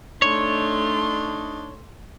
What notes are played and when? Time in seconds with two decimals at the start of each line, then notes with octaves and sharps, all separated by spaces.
0.22 A3 D4 D#4 C#5 C6